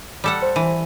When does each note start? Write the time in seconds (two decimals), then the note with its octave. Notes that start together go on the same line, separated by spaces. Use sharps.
0.24 G3 A4 F#5
0.42 C5
0.56 E3